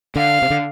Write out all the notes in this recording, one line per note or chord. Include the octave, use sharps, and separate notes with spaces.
D3 F5
C3
D3